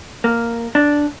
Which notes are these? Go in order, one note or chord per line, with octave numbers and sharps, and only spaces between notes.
A#3
D4